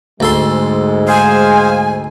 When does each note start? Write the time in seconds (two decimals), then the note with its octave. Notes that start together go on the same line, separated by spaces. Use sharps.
0.20 D2 G#2 G#3 A4 C6
1.08 G#4 C5 F5 G#5